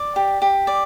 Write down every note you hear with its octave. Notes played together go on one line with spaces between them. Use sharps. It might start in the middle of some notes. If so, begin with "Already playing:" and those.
Already playing: D5
G4
G4
D5